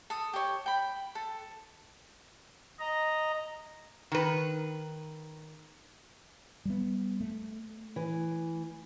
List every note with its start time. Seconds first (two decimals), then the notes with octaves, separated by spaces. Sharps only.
0.10 A4 D#6
0.33 G4 C#5
0.66 G5 B5
1.15 A4
2.79 D#5 A#5
4.12 D#3 B4
6.66 G3 B3
7.21 A3
7.96 E3